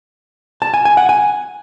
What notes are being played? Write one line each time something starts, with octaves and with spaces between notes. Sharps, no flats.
A5
G#5
G#5
F#5
G#5